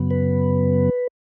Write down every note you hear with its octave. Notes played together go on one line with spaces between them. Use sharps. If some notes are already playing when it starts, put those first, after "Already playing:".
Already playing: F#2 C#3 F#3 B3
B4